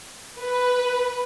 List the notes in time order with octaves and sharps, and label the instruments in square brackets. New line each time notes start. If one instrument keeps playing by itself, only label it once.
[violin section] B4